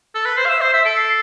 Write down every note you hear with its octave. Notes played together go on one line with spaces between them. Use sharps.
A4
B4
C5 C7
F5
E5 E7
C5 C7
E5 B6
A4 D7
C7